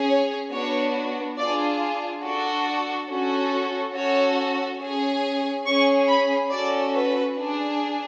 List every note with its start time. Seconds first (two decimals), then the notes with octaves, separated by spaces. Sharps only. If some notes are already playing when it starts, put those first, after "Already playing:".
Already playing: C#4 G#4
0.09 C#5
0.52 B3 D4 F#4 C#5
1.37 D4 F4 G#4 D5
2.23 D4 F#4 A4
3.08 C#4 F#4 A4
3.94 C#4 F#4 A4 C#5
4.80 C#4 G#4
5.66 C#4 G#4 C#6
6.08 B5
6.51 C#4 F#4 A4 D5
6.94 B4
7.37 D4 G#4